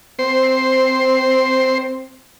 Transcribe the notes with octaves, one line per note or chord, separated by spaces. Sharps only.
C4 C5